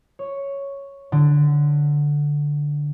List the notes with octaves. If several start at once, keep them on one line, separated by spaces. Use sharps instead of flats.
C#5
D3